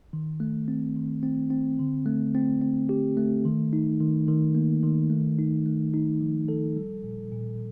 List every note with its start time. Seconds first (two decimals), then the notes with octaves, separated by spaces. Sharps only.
0.13 D#3
0.40 A3
0.68 C4
0.96 D#3
1.23 C4
1.50 C4
1.79 D3
2.06 A3
2.35 C4
2.61 C4
2.89 G4
3.17 A3
3.45 D#3
3.73 D#4
4.00 D#3
4.28 D#3
4.55 A#3
4.83 D#3
5.10 A3
5.39 D#4
5.66 A3
5.94 D#4
6.21 F3
6.48 A4
6.77 G3
7.04 A#2
7.32 A#2